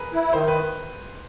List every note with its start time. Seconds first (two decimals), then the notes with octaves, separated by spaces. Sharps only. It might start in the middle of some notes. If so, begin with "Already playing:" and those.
Already playing: G#4 A#4 B4
0.13 E4
0.33 D#3 C5
0.48 B4